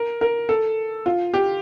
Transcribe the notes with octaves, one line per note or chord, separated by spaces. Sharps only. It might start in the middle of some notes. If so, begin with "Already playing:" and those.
Already playing: A#4
A#4
A4
F4
G4